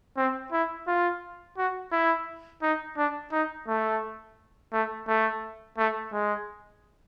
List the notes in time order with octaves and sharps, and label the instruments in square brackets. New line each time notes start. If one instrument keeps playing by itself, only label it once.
[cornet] C4
E4
F4
F#4
E4
D#4
D4
D#4
A3
A3
A3
A3
G#3